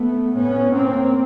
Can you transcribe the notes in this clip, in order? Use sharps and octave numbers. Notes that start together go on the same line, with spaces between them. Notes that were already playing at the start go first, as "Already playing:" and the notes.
Already playing: A3 B3
A2 B3 C#4
A#3 C4